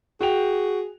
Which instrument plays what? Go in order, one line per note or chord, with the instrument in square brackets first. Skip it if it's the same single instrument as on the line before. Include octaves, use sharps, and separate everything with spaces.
[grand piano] F#4 G5 F7 [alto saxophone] G#4